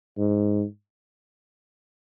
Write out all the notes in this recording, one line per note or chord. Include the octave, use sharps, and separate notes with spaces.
G#2